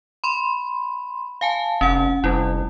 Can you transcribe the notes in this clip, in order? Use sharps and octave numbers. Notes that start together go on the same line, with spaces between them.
B5 C6
F5 G#5 A5
F1 C#4 F#5
F1 G3 E4